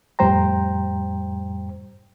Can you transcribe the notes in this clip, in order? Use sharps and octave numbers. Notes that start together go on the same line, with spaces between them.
F2 A2 G3 C5 G5 A#5